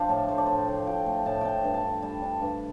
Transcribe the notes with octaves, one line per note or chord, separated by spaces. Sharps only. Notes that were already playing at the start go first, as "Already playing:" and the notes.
Already playing: F3 D4 C5 D5 F5 G5
A2 A4
A3 C5
D5
A2 C5
A2
F3 G5
A3
A2 A5
D4 G5 A5
G2
A5
G2
G3 A5
D4
G2